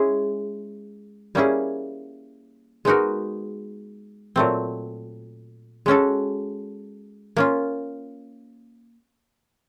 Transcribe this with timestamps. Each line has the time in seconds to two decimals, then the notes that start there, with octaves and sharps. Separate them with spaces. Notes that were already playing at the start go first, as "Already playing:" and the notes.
Already playing: G#3 C#4 E4 G#4
1.35 G3 A#3 C#4 E4 G#4
2.85 G#3 B3 D#4 F#4 A#4
4.36 A#2 F#3 A3 C4
5.86 G#3 C#4 F#4 A4
7.37 A#3 C#4 F4